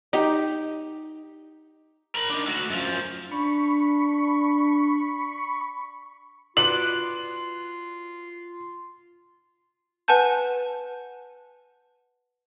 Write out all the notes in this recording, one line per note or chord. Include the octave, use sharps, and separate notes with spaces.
D#4 G4
A#4 B5
D4 D#4
A3 F#4
F#2 F3
D4 B5 C#6
F4 F#4 B4 D5 F#7
B4 F#5 G#5 A5 G6